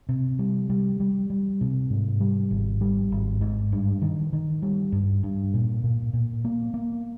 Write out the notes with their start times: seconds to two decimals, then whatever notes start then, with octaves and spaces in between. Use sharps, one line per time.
0.09 C3
0.39 G3
0.70 G3
1.00 G3
1.30 G3
1.61 C3
1.90 G#2
2.20 G3
2.51 G#1
2.81 G3
3.12 G#1
3.41 G#2
3.72 G2
4.02 D#3
4.33 D#3
4.62 G3
4.92 G2
5.23 G2
5.54 A#2
5.84 A#2
6.13 A#2
6.45 A#3
6.74 A#3